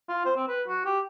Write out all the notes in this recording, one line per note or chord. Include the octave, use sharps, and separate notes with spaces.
F4
C5
C4
B4
F#4
G4